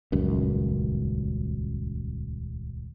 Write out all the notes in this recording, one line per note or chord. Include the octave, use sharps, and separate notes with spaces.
D#1 C#2 F#2